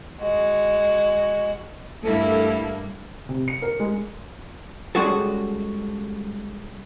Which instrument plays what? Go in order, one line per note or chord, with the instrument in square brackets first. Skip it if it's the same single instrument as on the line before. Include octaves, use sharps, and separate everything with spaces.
[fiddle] G#3 F#4
[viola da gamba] G2 G3 A#3 [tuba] A3 [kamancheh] E4 A4
[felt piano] C3
C#7
A#4
G#3
[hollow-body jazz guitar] G3 G#3 C#4 F#4 G#4 A4